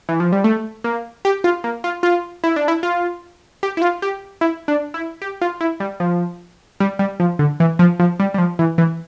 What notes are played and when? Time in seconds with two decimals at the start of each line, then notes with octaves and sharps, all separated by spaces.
0.09 E3
0.20 F3
0.32 G3
0.44 A3
0.84 A#3
1.25 G4
1.44 F4
1.64 A#3
1.84 F4
2.03 F4
2.44 E4
2.56 D4
2.68 E4
2.83 F4
3.63 G4
3.77 E4
3.82 F4
4.02 G4
4.41 E4
4.68 D4
4.94 E4
5.22 G4
5.41 F4
5.61 E4
5.80 G3
6.00 F3
6.80 G3
6.99 G3
7.20 F3
7.39 D3
7.60 E3
7.79 F3
8.00 F3
8.20 G3
8.34 G3
8.38 F3
8.59 E3
8.78 E3